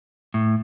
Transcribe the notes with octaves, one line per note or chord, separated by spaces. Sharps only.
A2